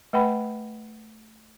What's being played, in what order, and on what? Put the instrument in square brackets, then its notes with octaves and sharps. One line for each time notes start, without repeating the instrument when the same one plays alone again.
[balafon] A3 B4 F#5 G5 B5